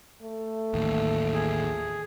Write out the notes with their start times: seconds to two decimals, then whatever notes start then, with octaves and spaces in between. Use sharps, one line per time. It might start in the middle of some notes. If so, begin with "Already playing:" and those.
0.22 A3
0.74 A1 D#2
1.34 G#4